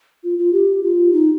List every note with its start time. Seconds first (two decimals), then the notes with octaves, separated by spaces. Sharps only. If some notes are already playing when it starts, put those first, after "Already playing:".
0.24 F4
0.38 F4
0.53 G4
0.83 F4
1.13 D#4